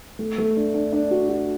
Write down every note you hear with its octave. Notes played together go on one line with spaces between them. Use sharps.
A3
A3
D4
D4
D4
F#4
F#4